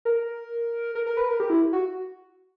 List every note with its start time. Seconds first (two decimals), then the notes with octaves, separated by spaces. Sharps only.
0.05 A#4
0.95 A#4
1.06 A#4
1.17 B4
1.29 A#4
1.40 G4
1.50 E4
1.73 F#4